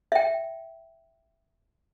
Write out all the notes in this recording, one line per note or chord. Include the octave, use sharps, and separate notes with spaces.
E5 G5